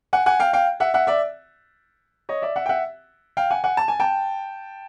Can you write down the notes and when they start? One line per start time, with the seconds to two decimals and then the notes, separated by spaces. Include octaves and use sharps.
0.13 F#5 G#5
0.26 F#5 G#5
0.40 F5 G5
0.53 F5 G5
0.80 E5 F#5
0.94 E5 F#5
1.07 D5 E5
2.29 C#5 D#5
2.42 D5 E5
2.56 E5 F#5
2.66 G5
2.69 E5 F#5
3.37 F5 G5
3.51 F#5 G#5
3.64 F#5 G#5
3.77 A5
3.88 G#5
4.00 G5 A5